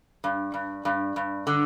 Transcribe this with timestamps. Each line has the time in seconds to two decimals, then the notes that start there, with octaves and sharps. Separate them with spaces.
0.24 G2
0.54 G2
0.85 G2
1.16 G2
1.47 D3